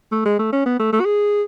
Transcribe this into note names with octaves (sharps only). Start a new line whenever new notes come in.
A3
G#3
A3
C#4
B3
A3
A3
F#4
G#4